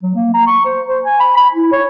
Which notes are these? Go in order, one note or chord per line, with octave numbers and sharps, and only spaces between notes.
F#3
A#3
A#5
C#6
C5
C5
G#5
B5
B5
E4
C#5